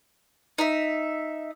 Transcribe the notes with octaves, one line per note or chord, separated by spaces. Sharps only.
D#4 E5